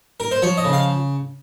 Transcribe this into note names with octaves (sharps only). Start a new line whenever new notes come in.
A#4
C5
F3 C#5
D#5
C#3
F5